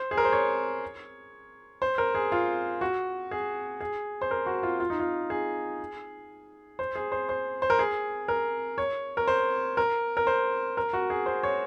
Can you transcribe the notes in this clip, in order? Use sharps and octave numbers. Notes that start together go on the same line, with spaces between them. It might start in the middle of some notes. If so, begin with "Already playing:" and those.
Already playing: C5
G#4
A#4
C5
C#5
C5
A#4
G#4
F4
F#4
G#4
G#4
C5
A#4
F#4
F4
F4
D#4
F4
G#4
C5
G#4
C5
C5
C5
A#4
G#4
A#4
C#5
A#4
C5
A#4
A#4
C5
A#4
F#4
G#4
C5
C#5